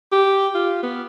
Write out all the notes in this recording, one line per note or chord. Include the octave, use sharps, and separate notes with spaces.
G4
F4
B3